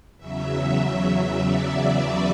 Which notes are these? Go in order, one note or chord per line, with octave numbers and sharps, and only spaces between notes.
E2 C#3 F#3 E5
D5
D5
B4